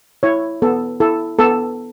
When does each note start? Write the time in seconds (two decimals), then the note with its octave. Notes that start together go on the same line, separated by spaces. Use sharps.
0.23 E4 C#5
0.62 B3 A4
1.00 E4 A4
1.39 B3 A4